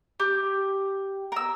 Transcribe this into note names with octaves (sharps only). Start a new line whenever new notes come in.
G4
A#4 E6